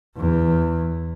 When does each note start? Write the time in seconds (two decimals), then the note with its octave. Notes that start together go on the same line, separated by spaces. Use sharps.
0.17 E2